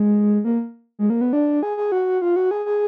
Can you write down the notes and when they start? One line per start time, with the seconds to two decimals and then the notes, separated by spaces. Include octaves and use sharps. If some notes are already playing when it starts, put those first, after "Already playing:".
Already playing: G#3
0.45 A#3
0.99 G#3
1.10 A#3
1.21 B3
1.33 D4
1.63 G#4
1.77 G#4
1.92 F#4
2.22 F4
2.36 F#4
2.51 G#4
2.66 G#4